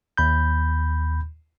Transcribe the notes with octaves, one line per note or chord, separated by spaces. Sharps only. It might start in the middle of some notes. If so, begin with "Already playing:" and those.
D#2 B5 G6